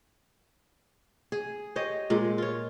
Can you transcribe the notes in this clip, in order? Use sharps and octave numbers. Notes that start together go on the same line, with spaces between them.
G#4
G4 C5 C#5 D#5
A#2 G#3
F4 C#5